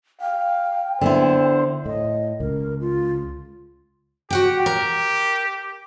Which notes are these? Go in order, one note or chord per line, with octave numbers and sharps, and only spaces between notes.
F5 G5
D3 B3 E4 C5
A2 D#5
C#2 A#4
F4
F#4 G4 F#5 G5
A#4